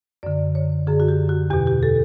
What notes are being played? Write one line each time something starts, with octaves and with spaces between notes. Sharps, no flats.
F#2 D3 D5
C#5
F#2 D3 G#4
F#4
G4
F#4
E2 B2 G4
G4
A4